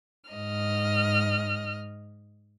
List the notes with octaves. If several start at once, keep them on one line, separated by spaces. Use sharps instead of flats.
G#2 D#5 F6